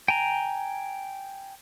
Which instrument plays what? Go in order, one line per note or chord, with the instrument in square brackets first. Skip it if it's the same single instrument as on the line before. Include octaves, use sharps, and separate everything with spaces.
[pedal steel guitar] G5 G#5 A#5